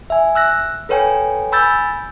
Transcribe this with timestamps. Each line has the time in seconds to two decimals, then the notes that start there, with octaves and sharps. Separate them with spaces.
0.10 E5 G#5
0.35 E6 F#6 A#6
0.89 A4 B4 C#5 G5 G#5
1.52 G#5 B5 E6 G6 A6